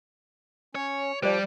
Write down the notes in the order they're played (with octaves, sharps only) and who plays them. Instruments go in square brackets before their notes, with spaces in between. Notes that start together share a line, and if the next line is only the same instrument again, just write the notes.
[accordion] C#4 [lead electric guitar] C#5
[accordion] F3 G4 [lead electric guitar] G3 [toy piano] C5 D5